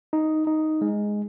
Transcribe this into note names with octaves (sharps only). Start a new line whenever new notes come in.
D#4
D#4
G#3